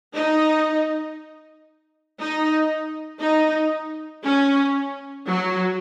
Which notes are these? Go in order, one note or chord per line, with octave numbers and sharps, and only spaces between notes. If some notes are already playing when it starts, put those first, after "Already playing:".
D#4
D#4
D#4
C#4
F#3